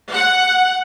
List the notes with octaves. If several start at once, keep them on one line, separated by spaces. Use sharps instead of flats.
F#5